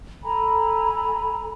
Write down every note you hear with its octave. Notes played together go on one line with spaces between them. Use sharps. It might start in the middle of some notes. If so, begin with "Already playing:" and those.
A4 G#5 A#5 B5